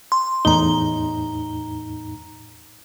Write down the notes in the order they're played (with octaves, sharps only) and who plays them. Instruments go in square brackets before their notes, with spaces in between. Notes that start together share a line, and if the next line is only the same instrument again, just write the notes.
[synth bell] C6
[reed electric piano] E2 A2 D#4 [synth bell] A#5 G7